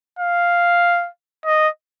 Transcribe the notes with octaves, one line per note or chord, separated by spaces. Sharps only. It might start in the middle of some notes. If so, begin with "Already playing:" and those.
F5
D#5